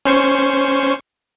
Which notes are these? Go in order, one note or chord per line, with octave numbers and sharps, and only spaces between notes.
C#4 C5 C#6